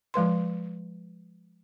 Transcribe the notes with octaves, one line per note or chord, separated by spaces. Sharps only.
F3 G#3 B4 C6